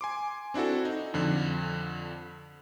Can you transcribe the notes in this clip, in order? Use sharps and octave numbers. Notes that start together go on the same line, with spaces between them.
G#5 C6 D6
C4 D4 E4 F#4 A4
D#4
F2 D3 F3